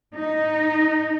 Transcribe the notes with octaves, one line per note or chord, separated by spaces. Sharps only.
D#4